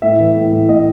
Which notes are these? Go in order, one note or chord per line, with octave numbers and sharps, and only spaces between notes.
A2 E5
E3
A2
A2
A2 D#5